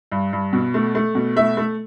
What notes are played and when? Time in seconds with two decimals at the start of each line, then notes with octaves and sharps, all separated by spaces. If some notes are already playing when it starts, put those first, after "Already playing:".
0.12 G2
0.33 G2
0.53 B2
0.74 A3
0.95 A3
1.15 B2
1.36 A3 E5
1.57 A3